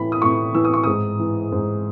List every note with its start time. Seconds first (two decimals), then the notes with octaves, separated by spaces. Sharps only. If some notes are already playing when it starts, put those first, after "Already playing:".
Already playing: A2 E3 B5
0.12 D#6
0.22 A2 C#6
0.55 E3 E6
0.65 D#6
0.74 C#6
0.84 G#2 D#6
1.19 E3
1.52 G#2